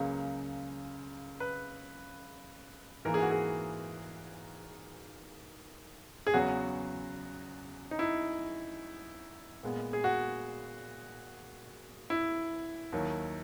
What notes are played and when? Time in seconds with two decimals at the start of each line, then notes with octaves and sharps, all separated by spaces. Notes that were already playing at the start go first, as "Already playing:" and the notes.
Already playing: C#2 C#3 F#3 A#3
1.40 B4
3.05 G#2 E3 A#3 A#4
3.14 G#4
3.22 F#4
3.31 G#4
6.27 G#4
6.34 E2 C#3 F#3 B3 F#4
7.91 D#4
7.99 E4
9.63 A#2 G#3 B3
9.93 G#4
10.04 F#4
12.10 E4
12.93 D#2 D#3 F#3